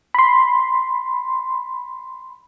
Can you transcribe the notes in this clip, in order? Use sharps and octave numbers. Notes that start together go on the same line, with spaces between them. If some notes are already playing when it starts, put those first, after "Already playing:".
B5 C6